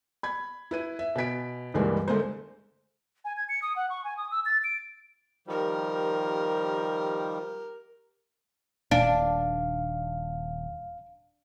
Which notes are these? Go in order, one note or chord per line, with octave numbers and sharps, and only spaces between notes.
B5 G#6
E4 B4 D#7
E5
B2 G#5 B6 D7
C#2 G2 E3 G3 G#3 A#3
D3 G#3 A3 A#4 C5
G#5
G#6
C#7
D#6
F#5
C#6
G#5
D#6
E6
A6
D7
D#3 F3 G3 G4 A#4
D#1 D4 F5